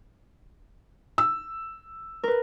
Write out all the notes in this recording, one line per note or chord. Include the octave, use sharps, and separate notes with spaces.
E6
A#4 B4